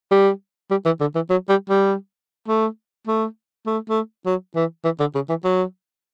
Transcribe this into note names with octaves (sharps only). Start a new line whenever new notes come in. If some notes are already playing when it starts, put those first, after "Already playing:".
G3
G3
E3
D3
E3
F#3
G3
G3
A3
A3
A3
A3
F#3
E3
E3
D3
C#3
E3
F#3